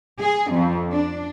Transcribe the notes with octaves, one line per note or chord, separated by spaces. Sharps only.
G#4
F2
D4